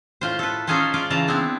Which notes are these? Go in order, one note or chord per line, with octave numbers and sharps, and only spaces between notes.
A2 F4 C5
A4 B4
C#4 D#4 F4 G#4 A4 C5
F4 D5 G#5
C#3 E3 F4 A5 A#5
B3 C4 D4 E4